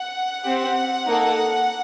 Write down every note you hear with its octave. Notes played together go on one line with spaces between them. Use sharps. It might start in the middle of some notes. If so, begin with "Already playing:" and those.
Already playing: F#5
C4 G4
A#3 D#4 A4